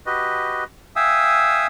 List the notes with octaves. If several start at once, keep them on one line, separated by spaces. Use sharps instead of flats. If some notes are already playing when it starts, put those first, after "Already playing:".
F#4 G4 B4 D#5
E5 F5 G5 G#5 D#6 E6